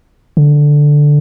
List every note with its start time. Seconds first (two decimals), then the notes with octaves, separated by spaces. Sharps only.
0.37 D3